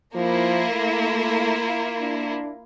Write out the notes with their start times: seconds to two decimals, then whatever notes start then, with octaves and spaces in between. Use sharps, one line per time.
0.15 F3 A#3 E4 F4
0.72 A3
2.00 D4